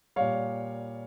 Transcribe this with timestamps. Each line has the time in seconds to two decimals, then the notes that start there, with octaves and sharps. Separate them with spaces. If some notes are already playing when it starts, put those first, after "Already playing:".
0.16 A#2 G3 C#5 F5